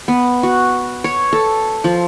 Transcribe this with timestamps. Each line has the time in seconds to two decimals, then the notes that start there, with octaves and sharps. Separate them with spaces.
0.08 B3
0.43 F#4
1.04 C#5
1.33 A4
1.84 F3